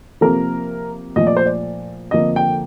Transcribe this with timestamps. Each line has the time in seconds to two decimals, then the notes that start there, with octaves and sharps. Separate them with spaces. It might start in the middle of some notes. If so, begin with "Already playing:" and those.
0.21 C3 F3 A#3 A#4
1.16 A#2 F3 A3 D#5
1.27 D5
1.37 C5
1.46 D5
2.11 F2 D3 F3 A#3 D#5
2.36 G5